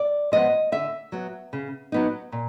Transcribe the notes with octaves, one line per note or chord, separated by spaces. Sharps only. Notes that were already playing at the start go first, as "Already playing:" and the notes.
Already playing: D5
F3 G#3 B3 D#5
D3 E5
F#3 B3
C#3
F#3 B3 D#4
A#2